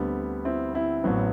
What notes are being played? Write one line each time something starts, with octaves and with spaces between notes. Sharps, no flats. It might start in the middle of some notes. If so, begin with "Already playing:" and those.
Already playing: D2 D3 G3 B3 C4
C4 E4
C4 E4
A1 A2 F#3 B3 C4